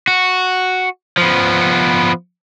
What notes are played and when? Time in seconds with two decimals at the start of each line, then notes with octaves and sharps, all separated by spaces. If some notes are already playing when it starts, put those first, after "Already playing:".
0.08 F#4
1.17 F3 B3